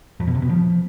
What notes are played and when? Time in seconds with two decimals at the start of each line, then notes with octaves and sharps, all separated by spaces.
0.20 F2
0.27 B2
0.35 C3
0.42 B2
0.49 F3